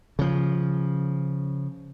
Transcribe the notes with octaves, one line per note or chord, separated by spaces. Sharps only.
C#3 F3